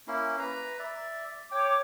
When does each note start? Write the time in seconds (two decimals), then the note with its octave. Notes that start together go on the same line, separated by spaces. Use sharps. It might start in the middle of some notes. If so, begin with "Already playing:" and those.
0.07 A#3 C#4 E4
0.39 B4 A#5
0.79 D5 E5
1.51 C#5 G5 D6